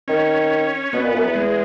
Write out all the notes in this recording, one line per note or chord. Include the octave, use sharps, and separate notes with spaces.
D#3 C#4
B2 B3
A#2
F#2
E2
G#3